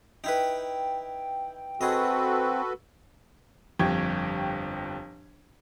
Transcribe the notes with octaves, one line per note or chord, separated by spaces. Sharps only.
D#4 E4 B4 G5
C4 F#4 G#4 A4 B4 D#5
G1 F2 G4 G5 C#6 G#6